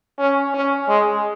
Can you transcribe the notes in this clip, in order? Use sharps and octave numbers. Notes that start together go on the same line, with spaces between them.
C#4
C#4
G#3